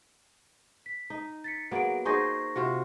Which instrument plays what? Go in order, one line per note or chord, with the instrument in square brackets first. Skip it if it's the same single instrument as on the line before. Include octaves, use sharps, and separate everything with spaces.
[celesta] B6
[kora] D#4
[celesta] A6 B6 C#7
[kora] F#3 A#3 B3 [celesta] G#4 F#5 D7
[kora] D#4 G#4 C5 [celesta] C#6 A#6
[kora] C3 F4 F#4